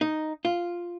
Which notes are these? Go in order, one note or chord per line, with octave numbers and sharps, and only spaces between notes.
D#4
F4